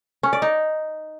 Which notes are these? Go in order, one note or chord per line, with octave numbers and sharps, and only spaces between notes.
C#4
D5
D#4